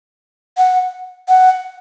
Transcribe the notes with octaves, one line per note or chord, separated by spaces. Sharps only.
F#5
F#5